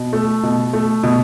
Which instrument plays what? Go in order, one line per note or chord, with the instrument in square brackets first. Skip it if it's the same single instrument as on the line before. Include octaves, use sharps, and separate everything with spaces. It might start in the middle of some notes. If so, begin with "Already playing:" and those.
Already playing: [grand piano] B2
A3
B2
A3
B2